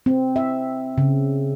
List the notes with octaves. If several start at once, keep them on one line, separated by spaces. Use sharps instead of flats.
C4
E5
C#3